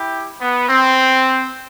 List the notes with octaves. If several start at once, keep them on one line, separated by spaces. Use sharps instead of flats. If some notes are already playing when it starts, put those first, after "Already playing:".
Already playing: E4 G4
B3
C4